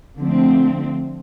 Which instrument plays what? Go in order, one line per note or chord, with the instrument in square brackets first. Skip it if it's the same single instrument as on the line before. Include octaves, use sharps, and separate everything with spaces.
[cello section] D3 F3 A3 C4